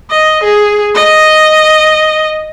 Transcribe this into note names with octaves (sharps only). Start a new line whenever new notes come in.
D#5
G#4
D#5